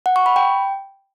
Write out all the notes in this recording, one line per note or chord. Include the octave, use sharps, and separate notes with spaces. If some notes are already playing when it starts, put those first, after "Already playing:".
F#5
C#6
B5
G5